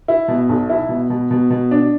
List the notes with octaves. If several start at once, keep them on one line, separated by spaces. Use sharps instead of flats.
E4
B2
B1
E4
B2
B2
B2
B2
D4